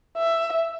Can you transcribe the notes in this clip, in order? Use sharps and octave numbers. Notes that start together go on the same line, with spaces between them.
E5